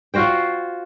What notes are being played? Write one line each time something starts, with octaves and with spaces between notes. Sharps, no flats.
F4 F#4 C5 G5